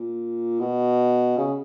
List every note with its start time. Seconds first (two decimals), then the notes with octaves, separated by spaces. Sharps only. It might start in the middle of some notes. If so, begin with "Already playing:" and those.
Already playing: A#2
0.60 B2
1.38 C#3